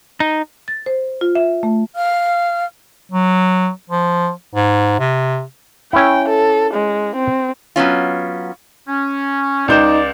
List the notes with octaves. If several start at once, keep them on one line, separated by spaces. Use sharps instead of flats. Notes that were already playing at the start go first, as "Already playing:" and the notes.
D#4
A6
C5
F4
E5
A3
F5 F6
F#3
F3
G#2
C3
C#4 E4 G5
A4
G#3
C4
F#3 B3 C#4 F4
C#4
C#2 D#4 D5 G6 E7